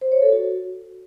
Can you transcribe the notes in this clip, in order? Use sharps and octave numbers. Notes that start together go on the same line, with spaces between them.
C5
C#5
A4
F#4